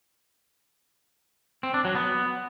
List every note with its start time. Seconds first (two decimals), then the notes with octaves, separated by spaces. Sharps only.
1.63 C4
1.74 D4
1.85 F#3
1.95 B3